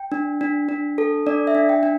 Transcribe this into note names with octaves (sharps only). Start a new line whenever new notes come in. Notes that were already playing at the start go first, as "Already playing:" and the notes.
Already playing: G5
D4
D4
D4
A4
D4 D5
E5
D4
G5
D4